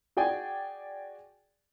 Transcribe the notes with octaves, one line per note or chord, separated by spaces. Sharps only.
F#4 G#4 D5 G5 G#5